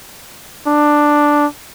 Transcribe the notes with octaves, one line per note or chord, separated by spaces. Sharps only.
D4